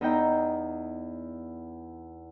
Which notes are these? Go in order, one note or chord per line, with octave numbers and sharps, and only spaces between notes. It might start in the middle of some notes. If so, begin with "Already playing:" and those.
E2 D#4 E5 G5 A#5